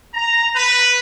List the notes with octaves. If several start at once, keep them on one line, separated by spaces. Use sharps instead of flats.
A#5
B4